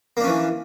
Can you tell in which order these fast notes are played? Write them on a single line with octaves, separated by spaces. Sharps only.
A#3 D4 C#4 E3